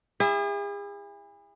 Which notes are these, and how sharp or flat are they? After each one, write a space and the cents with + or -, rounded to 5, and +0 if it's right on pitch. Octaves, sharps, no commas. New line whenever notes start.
E4 +0 G#4 -40 E5 +0